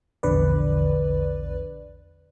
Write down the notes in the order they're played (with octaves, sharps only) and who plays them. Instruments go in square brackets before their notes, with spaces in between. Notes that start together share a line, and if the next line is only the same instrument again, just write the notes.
[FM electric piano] A#1 E2 D3 B4 D5